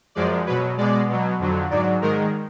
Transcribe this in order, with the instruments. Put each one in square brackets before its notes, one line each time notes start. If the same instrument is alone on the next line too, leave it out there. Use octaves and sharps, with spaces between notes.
[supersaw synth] F#2 F3 G#3 D5
B2 F#3 B4
B2 G#3 D5
B2 F#3
F2 D3 F#3
G#2 F#3 D5
G#2 D#3 G#3 A#4